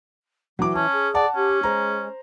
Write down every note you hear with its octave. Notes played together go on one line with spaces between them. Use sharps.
E3 F#3 D6
C#4 A5
G#4
D5 F#5 A5
C#4 G4
G#3 C5 A#5